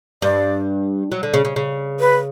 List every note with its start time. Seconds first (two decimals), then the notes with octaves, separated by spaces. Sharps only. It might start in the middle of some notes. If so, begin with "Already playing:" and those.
0.22 G2 D5
1.12 F#3
1.23 D3
1.34 C#3
1.45 C#3
1.56 C#3
2.00 B4